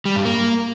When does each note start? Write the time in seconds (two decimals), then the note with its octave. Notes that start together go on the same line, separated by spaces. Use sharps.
0.05 G3
0.15 G2
0.25 A#3